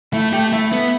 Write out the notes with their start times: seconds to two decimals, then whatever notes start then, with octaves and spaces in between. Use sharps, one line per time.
0.13 A3 E4 E5
0.32 A3 G4 G5
0.53 A3 E4 E5
0.72 B3